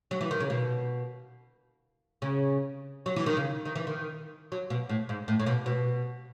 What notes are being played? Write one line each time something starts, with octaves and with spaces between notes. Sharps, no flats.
F#3
E3
D#3
C#3
B2
C#3
F#3
E3
D#3
C#3
D#3
E3
D#3
F#3
B2
A2
G#2
A2
A2
B2
B2